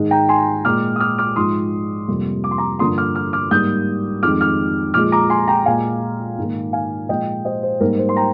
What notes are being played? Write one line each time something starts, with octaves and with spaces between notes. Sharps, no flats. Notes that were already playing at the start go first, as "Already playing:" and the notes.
Already playing: G#2 D#3 G#3
G5 A#5
G#5 C6
A#2 G#3 D6 F6
D#6
D6 F6
D6 F6
G#2 F3 G#3 C6 D#6
F2 C3 G3 A#3
D6
C6
A#5 D6
G2 D3 F3 A#3 C6 D#6
D6 F6
D6 F6
D6 F6
G#2 G3 A#3 D#6 G6
F2 D#3 G#3 D6 F6
D6 F6
A#2 F3 G#3 D6 F6
A#5 D6
G#5 C6
G5 A#5
A#2 G#3 F5 G#5
G#2 D#3 A#3
F5 G#5
A#2 F3 G#3 D#5 G5
C5 D#5
C5
G#2 G3 A#3 A#4
C5
C6
G5 A#5